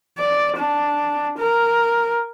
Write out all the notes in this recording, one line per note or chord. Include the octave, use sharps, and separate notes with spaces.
D5
D4
A#4